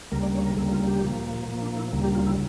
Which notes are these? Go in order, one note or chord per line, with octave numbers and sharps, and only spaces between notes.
D2 C#3 G3 A#3 A#4
D5
C#5
A#4
D2 C#3 G3 A#3 A4
F4
G4
A#2 F3 A#3
A#2 F3 A#3
D4
E4
D2 C#3 G3 A#3
G4
F4
E4